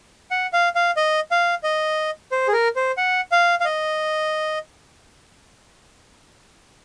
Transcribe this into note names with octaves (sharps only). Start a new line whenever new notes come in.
F#5
F5
F5
D#5
F5
D#5
C5
G#4
A#4
C5
F#5
F5
F5
D#5